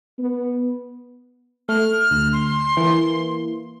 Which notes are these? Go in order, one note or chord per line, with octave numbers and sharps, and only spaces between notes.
B3
A3 F6
D2
C6
E3 A#3